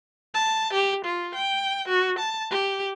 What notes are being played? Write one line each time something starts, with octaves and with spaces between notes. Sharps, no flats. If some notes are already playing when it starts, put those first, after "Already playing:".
A5
G4
F4
G5
F#4
A5
G4